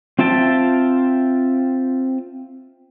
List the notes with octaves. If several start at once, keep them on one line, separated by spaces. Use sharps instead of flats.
C4 F4 E5 G5 A5